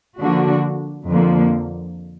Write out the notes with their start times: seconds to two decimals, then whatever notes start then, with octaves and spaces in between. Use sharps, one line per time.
0.20 D3 F3 A#3 D4 F#4
1.10 F2 D3 F3 A#3